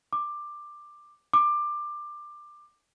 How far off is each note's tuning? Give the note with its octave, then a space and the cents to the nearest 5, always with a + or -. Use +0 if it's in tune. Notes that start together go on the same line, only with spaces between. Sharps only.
D6 +15
D6 +20